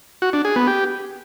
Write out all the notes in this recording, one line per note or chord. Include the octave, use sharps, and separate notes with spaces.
F#4
D4
G#4
B3
G4